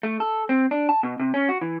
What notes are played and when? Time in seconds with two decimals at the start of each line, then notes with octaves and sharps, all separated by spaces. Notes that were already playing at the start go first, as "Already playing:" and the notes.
0.03 A3
0.20 A4
0.49 C4
0.71 D4
0.89 A5
1.03 B2
1.20 C3
1.34 C#4
1.49 F#4
1.61 E3